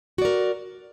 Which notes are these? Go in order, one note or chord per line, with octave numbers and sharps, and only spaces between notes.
F#4 A#4 D5